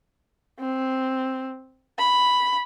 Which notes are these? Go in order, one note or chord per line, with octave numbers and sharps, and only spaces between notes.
C4
B5